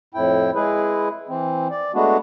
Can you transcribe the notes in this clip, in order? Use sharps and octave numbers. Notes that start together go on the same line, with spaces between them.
F2 A2 E4 G5
G#3 E4 G#4 B4
E3 C4
D5
G#3 A3 B3 D4 F#4